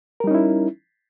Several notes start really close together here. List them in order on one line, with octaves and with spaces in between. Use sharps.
A#4 G3 D#4 C#4 E4